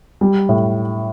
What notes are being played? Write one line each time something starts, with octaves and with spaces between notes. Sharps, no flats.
G3
A2